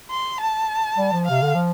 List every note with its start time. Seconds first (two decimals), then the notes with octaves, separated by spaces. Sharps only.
0.11 C6
0.41 A5
0.98 G3
1.12 F3
1.26 C3 F5
1.42 D3
1.55 F3